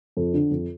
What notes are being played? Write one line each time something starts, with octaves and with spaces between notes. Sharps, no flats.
F2
D3
F2